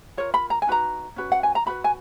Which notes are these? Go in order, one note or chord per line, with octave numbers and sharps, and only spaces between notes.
F4 A#4 C#5
B5
A#5
G#5
D#4 F#4 B4 A#5
C#4 F#4 B4
F#5
G#5
A#5
D#4 F#4 B4 B5
G#5